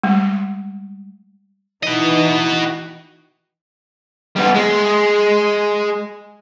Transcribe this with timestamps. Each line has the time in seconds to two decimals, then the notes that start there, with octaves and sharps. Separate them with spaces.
0.04 G3 G#3
1.83 E3 D#4 F#4 D#5
4.36 G3 B3
4.55 G#3